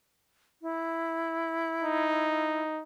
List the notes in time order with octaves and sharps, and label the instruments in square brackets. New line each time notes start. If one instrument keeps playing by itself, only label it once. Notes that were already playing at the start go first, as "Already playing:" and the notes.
[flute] E4
[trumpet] D#4